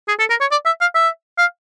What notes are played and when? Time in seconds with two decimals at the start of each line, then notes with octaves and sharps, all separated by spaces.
0.08 G#4
0.19 A4
0.30 A#4
0.41 C#5
0.51 D5
0.66 E5
0.81 F5
0.95 E5
1.38 F5